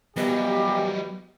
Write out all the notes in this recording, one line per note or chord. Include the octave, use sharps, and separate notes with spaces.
E3 F#3 G3 A#3 B3 G4 D#5